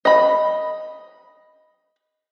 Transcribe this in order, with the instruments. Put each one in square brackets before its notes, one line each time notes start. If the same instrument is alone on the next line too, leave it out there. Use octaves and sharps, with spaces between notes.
[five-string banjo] D#5 B5